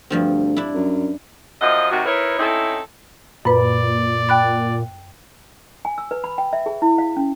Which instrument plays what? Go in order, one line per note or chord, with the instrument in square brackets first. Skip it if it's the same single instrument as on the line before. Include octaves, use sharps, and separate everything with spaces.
[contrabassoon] D2 [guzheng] G2 F3 C4
[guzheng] D4 E4
[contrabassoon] F#2
[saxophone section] F#2 F3 D#5
C3 D#3 F#3 F#4
D#4 E4 A#4 B4 C#5
C4 C#4 D#4 E4 A4
[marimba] F#2 B4 [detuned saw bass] A#2 [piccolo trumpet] D5 [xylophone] B5
[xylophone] G5 F#6 A6 [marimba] B5
[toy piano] G#5
E6
B4
B5
G5
E5
G#4
E4
F5
C#4